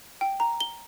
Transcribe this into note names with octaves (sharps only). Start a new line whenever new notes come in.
G5
A#5
G7